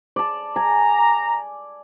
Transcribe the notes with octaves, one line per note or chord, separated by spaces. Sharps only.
D5 A5
G#5 A#5